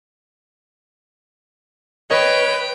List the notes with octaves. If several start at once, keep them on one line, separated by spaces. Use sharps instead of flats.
B4 C#5 D#5 G5